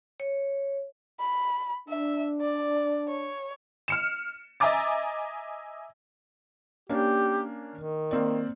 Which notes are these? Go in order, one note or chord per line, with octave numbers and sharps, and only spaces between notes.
C#5
B5
D4 E5
D5
C#5
F6 C#7 E7
D#5 E5 G#5 A#5 D6 A6
A#3 C#4 D4 G4
D#3
A#3 C4 D5